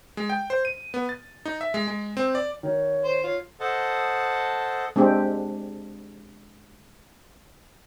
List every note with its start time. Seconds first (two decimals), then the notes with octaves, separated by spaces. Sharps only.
0.17 G#3
0.30 G5
0.50 C5
0.65 D#7
0.94 B3
1.09 A6
1.45 D#4
1.61 E5
1.74 G#3
1.88 G#3
2.17 C4
2.35 D5
2.63 D#3 C#5
3.04 C5
3.23 F4 C#5
3.60 A4 C5 D#5 F#5 A5
4.96 G#3 C4 D4 G4